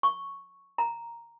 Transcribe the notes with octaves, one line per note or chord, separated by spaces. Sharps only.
C#6
A#5